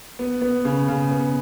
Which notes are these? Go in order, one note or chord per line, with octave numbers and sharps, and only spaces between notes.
B3
B3
C#3
C#3
B3